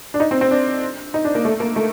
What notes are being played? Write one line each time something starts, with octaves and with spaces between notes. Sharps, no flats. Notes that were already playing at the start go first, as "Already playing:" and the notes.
D4
D#4
C4
C4
D4
D#4
D4
A#3
A3
A#3
A3